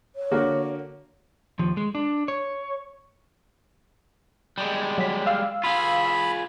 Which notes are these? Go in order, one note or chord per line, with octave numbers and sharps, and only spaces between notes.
C#5
D3 A#3 F#4
D#2 F3
G#3
D4
C#5
G3 G#3
F#3 B6
F5 E6
F4 G#4 B5